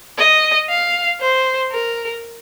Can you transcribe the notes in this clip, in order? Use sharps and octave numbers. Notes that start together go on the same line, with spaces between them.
D#5
F5
C5
A#4